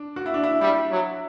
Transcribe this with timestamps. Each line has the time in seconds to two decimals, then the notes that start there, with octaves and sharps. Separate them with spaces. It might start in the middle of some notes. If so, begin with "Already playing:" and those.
Already playing: D4
0.16 F#4
0.26 E4
0.34 D4
0.44 E4
0.61 G3 E4
0.91 F#3